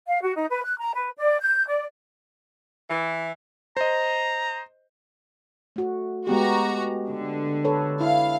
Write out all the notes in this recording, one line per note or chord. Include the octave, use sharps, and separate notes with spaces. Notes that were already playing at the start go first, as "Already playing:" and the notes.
F5
F#4
D#4
B4
F#6
A#5
B4
D5
G6
D5
E3
C5 D#5 A#5
A3 F#4
G#3 B3 F#4 G4 A#5
D3
A4 B4 C#5
E4 F5